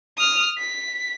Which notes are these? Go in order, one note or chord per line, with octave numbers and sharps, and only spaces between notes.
D#6 F6
B6